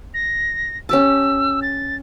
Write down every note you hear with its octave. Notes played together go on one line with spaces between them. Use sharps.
A#6
C#4 G4 A5 E6
A6